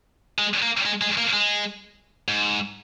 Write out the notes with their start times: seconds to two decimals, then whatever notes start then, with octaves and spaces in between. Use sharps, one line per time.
0.38 G#3
0.62 A#3
0.86 G#3
1.01 G#3
1.17 A#3
1.33 G#3
2.28 G#2